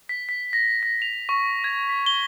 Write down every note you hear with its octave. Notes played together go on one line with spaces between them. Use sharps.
B6
B6
A#6
A#6
F7
C#6
G#6
B6
G7